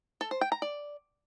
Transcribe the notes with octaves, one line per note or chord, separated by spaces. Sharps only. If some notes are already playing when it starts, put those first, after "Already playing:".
A4
C5
G5
A#5
D5